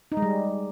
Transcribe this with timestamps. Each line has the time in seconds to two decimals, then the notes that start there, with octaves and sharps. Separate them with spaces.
0.12 D#4
0.17 G#3
0.22 G3